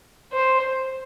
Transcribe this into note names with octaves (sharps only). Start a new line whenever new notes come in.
C5